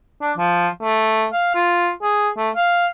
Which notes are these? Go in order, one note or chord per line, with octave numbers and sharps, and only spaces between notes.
D4
F3
A3
F5
F4
G#4
A3
F5